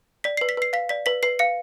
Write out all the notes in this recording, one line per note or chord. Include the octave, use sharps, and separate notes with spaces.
D5 B6
B4 C7
B6
B4 C7
F5 B6
D5 B6
B4 B6
B4 C7
F5 C#7